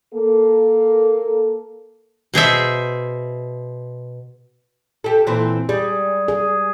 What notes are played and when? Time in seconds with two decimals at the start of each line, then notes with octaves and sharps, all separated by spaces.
0.14 A#3 A4
2.34 B2 G#4 C5 E5
5.04 G4 A4
5.27 A#2 E3 C4
5.69 G3 G#4
6.28 G#4